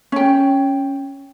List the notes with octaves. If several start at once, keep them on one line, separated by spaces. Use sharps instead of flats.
C#4 G5